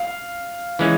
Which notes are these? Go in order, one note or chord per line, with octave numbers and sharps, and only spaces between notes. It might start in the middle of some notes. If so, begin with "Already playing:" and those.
Already playing: F5
E3 G#3 C#4